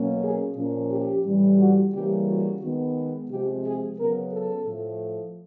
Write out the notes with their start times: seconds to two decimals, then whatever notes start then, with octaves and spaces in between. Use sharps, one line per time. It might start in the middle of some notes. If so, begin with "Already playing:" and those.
Already playing: B2 F#3 A#3 C#4
0.23 G#4
0.57 A#2 F3 A#3 C#4
0.91 G4
1.26 A2 E3 G3
1.59 F#4
1.94 C#3 E3 G3 A#3 G4
2.28 F#4
2.62 D#3 G#3 B3
3.30 C3 F3 G#3 C4 G4
3.65 G#4
3.98 C#3 F#3 B3 A#4
4.33 A4
4.66 A2 F3 A3